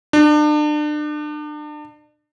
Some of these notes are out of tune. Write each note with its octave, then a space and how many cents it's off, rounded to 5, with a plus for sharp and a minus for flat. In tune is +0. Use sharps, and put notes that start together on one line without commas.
D4 +35